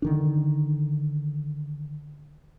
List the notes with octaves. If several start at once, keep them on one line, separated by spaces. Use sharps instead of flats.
D3 D#3 D4